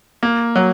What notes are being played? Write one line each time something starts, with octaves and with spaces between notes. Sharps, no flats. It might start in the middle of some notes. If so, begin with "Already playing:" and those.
A#3
F#3